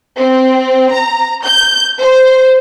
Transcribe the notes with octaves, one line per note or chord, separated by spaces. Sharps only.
C4
A#5
G6
C5